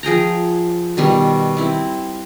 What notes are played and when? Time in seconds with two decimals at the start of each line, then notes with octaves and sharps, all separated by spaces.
0.03 F3 G#4 G5 A#5
0.97 B2 D#3 G3
1.57 C4 E4